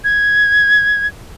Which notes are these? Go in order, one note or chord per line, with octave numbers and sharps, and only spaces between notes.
G#6